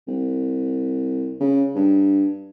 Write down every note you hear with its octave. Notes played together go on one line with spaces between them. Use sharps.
C2
C#3
G2